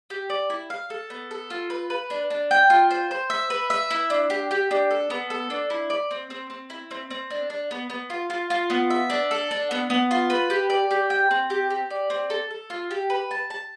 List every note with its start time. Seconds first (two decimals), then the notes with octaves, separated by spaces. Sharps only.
0.10 G4
0.30 D5
0.50 E4
0.70 F5
0.90 A4
1.10 B3
1.31 A4
1.50 F4
1.70 B4
1.90 B4
2.10 D4
2.30 D4
2.51 G5
2.70 F4
2.91 C5
3.11 C5
3.30 E5
3.50 B4
3.70 E5
3.90 E4
4.10 D4
4.30 G4
4.51 G4
4.71 D4
4.91 A4
5.10 B3
5.30 A4
5.50 D4
5.70 E4
5.90 D5
6.11 C4
6.30 C4
6.50 C4
6.70 E4
6.91 C4
7.10 C4
7.30 D4
7.50 D4
7.71 B3
7.90 B3
8.10 F4
8.30 F4
8.50 F4
8.70 B3
8.90 E5
9.10 D4
9.31 A4
9.51 D4
9.71 B3
9.90 B3
10.11 F4
10.30 B4
10.50 G4
10.70 D5
10.91 G4
11.10 G5
11.31 C4
11.50 G4
11.70 G4
11.90 D5
12.10 C4
12.30 A4
12.50 A4
12.70 F4
12.91 G4
13.10 B4
13.31 A5
13.50 A5